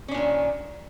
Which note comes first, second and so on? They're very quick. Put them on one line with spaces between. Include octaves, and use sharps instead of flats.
C#4 D4 A#2 D#3